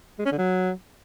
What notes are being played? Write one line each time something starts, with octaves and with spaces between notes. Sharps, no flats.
G#3
C#4
D3
F#3